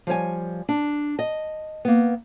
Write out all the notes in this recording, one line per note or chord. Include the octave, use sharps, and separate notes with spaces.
F3 G3 C#5 G#5
D4
D#5
A#3 B3